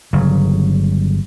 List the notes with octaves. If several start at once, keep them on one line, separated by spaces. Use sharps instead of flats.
G1 C#3 F#3